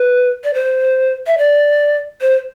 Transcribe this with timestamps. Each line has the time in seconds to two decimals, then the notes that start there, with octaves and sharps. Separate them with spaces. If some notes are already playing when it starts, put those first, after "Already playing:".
Already playing: B4
0.44 D5
0.54 C5
1.27 E5
1.38 D5
2.21 C5